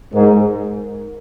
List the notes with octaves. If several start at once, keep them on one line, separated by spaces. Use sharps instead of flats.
G#2 A#4